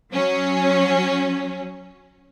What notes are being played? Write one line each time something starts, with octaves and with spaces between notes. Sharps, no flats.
F#3 C#4